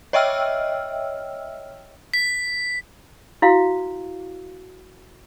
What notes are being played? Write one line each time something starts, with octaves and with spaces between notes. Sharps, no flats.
C#5 D#5 E5 G5 E6 F6
B6
E4 F#4 F5